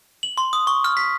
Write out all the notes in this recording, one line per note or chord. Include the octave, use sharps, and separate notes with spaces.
F#7
C6
D#6
C#6
F6
B6